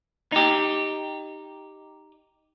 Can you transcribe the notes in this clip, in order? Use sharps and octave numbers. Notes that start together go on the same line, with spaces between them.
D#4 G4